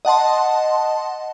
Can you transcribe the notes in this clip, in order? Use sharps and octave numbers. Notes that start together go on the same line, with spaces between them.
D#5 F#5 A5 C6